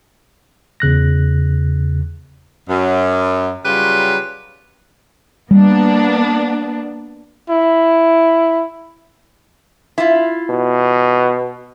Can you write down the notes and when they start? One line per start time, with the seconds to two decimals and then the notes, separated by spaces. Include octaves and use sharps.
0.80 E2 C#3 F#6 A#6
2.69 F#2
3.65 C#3 F#3 G3 F4 G4 B4
5.51 G3 A#3 B3 D4
7.50 E4
9.98 E4 F4
10.50 B2